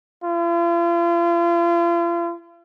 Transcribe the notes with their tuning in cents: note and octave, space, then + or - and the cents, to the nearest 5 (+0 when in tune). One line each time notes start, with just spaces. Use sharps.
F4 -40